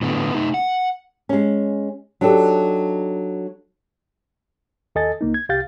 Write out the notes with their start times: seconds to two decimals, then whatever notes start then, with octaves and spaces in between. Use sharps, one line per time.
0.02 A2 D3 B3
0.34 A3 D#4
0.54 F#5
1.29 G#3 C#4
2.21 F#3 D4 D#4 G4 A4
4.95 D#2 A4 D#5 G#5 A6
5.21 C#2 A#3 D#4
5.34 G#6
5.49 C2 G4 F5 G6 A6